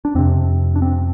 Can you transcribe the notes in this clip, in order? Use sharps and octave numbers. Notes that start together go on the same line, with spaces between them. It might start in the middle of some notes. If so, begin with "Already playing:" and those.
D4
F2 C3 C4
D4
C4